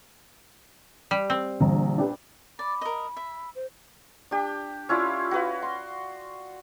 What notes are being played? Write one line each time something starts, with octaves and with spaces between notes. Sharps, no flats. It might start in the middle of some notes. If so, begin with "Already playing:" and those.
G3
C4
A#1 D3 E3 G3 A#5
D4 G4 B4
D5 B5
A#4 D#5
E5
C5
D4 G4
C#4 E4 F4 D5
F#4 B4 F5
C6